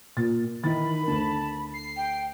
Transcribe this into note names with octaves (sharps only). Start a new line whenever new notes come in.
A#2 A6
D#3 E3 B5 A6
D2 D3 A5
C7
G5